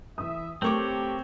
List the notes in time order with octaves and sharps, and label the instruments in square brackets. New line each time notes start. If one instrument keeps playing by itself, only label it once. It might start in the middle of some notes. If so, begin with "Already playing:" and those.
[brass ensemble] E3 E5 [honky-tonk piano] D#6
[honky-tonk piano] A3 [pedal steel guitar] C4 C#5 [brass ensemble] G4 [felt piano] A#4 C#6 D6